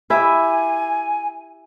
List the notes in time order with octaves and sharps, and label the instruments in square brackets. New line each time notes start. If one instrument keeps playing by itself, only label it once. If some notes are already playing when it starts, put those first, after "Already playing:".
[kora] E4 G4 E5 [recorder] G#5